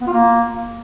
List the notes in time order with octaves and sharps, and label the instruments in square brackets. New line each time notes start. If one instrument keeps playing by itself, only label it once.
[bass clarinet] B3
F4
A#3